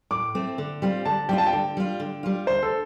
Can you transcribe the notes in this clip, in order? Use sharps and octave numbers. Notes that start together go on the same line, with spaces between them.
A2 D6
A3 C4
D3
G3 C4 F4
D3 A5
G3 C4 F4 G5
A5
G5
D3
G3 F4
D3
G3 F4
D2 C5
A4